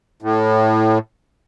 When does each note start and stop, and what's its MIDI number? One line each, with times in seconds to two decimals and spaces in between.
0.22 0.98 45